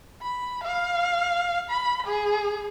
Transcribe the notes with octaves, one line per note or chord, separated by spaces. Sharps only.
B5
F5
B5
G#4